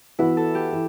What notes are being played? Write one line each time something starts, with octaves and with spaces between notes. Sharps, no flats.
E3 B3 E4 F#4
A4
G4
E3